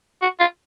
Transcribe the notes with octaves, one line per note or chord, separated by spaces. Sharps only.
F#4
F4